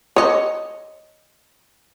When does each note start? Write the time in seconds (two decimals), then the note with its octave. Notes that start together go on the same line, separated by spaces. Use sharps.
0.16 C#5 D#5